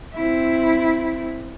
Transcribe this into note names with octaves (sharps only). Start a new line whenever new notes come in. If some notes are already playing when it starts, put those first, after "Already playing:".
C4 E4